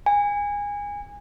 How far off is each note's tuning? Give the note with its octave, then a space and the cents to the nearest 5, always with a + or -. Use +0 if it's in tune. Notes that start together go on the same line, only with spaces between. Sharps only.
G#5 -25